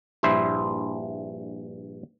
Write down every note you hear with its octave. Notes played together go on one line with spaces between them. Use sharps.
A#1 G2 E4 C5 E5